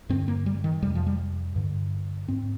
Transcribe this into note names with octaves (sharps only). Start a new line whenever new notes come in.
G2 D3 C4
A#3
G3
D#3
F2 C3 G3
F3
G3
G2 D3
G#2 C4